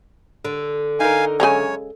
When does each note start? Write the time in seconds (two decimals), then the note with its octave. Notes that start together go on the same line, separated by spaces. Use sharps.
0.45 D3
1.00 D#4 A#4 F5 G#5
1.40 F#2 C#3 G#3 C#5 G#5 A#5